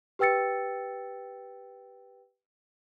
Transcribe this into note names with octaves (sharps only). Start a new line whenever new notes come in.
G4 B4 G5 E6 A6 C#7